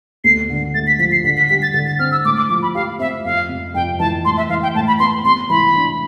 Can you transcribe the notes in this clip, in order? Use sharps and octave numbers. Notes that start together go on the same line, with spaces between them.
D2 C7
D3
A3 A6
B6
F3 B6
C7
D3 B6
B6
G3 B6
A6
D3 A6
A6
C4 F6
E6
A2 D6
D6
F3 D6
B5
G4 F5
C4 E5
F2 F5
C3
F2 G5
E3 A5
A2 C6
E5
E3 F5
G5
A2 A5
B5
B3 C6
C3 C6
E3 B5
D4